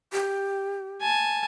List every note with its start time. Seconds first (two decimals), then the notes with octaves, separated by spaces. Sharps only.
0.13 G4
1.01 G#5 A5